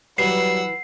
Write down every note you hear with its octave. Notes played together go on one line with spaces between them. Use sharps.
E3 F#3 G3 B4 F#5 E6 C7